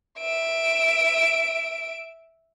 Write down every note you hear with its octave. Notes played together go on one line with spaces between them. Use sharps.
E5 D7